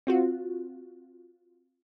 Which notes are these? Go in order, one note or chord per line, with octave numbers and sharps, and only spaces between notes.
C4 F4 F#4